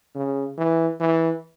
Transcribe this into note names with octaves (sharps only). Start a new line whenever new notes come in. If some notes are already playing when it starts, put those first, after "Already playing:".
C#3
E3
E3